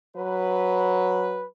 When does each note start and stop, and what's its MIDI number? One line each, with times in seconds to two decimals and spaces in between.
0.16 1.44 54
0.16 1.45 71